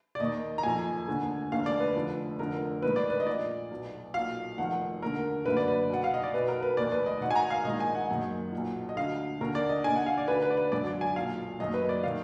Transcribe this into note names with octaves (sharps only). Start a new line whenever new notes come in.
D5
D#2 D#3 D#5
A#5
F#1 F2 D#3 G#5
F1 D#2 D3
F1 D#2 D3 F5
D5
B4
F1 F2 D3
F1 F2 D3 A#4
A#1 G#2 D#3 B4
D5
B4
D#5
A#1 A#2 D5
B1 B2
B1 A#2 F5
F1 F2 D#3 F#5
D#2 D3 A#4
F#1 F#2 D3 B4
D5
B4
B1 B2 F#5
F5
D#5
D5
B1 B2 B4
A#4
B4
F1 D#2 D#3 D5
B4
D#5
G#1 G#2 D#3 F#5
G#5
A#5
F5
A#1 G#2 D#3 D#5
G#5
F#5
F#1 F#2 D#3
B1 A#2
D#5
D2 D3 F5
D#2 D3 A#4
D5
D#5
D#2 D3 G#5
F#5
F5
D5
D2 D3 B4
B4
D5
B4
G#1 F#2 D3 D5
D5
G#5
B1 A#2 F5
F#1 F#2 D#3 D#5
B4
D5
D#3 F5